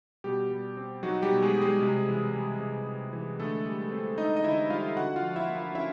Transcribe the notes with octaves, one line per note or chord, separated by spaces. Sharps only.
B2 G3 G4
G3
C4
F#3 D#4 F#4
G3 G4
B2
G#3 G#4
G3 G4
G#3 G#4
C3
E3
G3
C3
C3
E3
D3 A3 A4
G3
C4
D#4 D#5
D#5
D3 E4 E5
G3 F4 F5
D3 F#4 F#5
F4 F5
F3
E4 E5
A#3
F4 F5
C#4 E4 E5